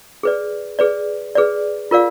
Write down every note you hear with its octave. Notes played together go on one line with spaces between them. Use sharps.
G#4 B4 D5
G#4 B4 D5
G#4 B4 D5
F4 A#4 D5 F5